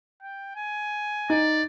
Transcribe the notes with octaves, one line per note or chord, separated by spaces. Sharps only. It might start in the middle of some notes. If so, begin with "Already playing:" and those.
G5
G#5
D#4 D5